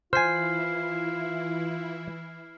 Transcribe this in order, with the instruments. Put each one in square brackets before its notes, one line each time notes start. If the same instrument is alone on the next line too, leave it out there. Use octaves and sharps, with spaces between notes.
[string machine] E3 E4 [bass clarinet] F4 [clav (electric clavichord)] C5 G#5 [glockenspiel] F6 C7